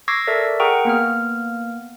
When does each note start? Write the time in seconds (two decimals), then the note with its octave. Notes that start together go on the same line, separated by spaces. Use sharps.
0.08 C#6 D6 E6 G#6 A#6 C7
0.27 A4 A#4 D5 E5
0.60 G#4 A#4 F#5 G5 A#5 C#6
0.85 A#3 B3 F6